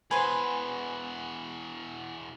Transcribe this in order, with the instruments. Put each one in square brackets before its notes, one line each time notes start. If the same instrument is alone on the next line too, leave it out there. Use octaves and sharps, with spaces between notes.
[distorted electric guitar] E2 B2 [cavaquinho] B4 C5 [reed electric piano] G#5